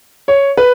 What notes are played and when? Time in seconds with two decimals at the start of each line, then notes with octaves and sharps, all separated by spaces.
0.28 C#5
0.57 B4